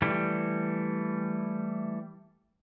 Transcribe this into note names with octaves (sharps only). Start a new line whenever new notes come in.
E3 G3 A3